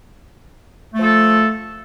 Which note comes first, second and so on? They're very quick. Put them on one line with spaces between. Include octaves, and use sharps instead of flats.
A3 F3 A4